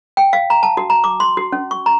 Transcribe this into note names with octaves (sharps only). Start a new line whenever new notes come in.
G5
F5
A#5
A5
F#4
A#5
D6
C6
F#4
C#4
C#6
A#5